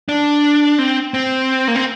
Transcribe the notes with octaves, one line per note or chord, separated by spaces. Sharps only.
D4
C4
C4
A#3
C4